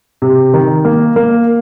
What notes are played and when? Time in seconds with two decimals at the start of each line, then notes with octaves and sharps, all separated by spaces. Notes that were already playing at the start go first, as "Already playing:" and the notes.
0.22 C3
0.54 D#3
0.85 A#3
1.16 A#3